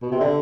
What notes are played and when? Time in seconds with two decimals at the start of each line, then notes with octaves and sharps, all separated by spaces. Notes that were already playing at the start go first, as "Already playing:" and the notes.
0.02 B2
0.11 C3
0.20 D3